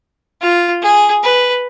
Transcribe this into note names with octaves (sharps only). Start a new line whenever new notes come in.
F4
G#4
B4